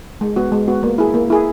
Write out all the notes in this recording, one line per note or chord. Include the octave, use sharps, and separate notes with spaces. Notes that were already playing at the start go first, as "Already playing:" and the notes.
G#3
B3 F#4
G#3
B3 F#4
A#3
E4 G#4
A#3
E4 G#4